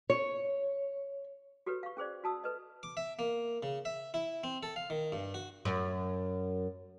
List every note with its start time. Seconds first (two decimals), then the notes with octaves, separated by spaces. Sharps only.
0.10 C#5
1.66 F#4 G4 A4 B4 C#5
1.83 F5 C#6
1.97 C#4 G#4 C5 D5
2.24 F#4 A5 D#6 E6
2.44 A4 B4 D#5
2.83 D6
2.97 E5
3.19 A#3
3.63 C#3
3.85 E5
4.14 E4
4.44 C4
4.63 A4
4.76 F5
4.90 D#3
5.12 G2
5.34 F#4
5.65 F#2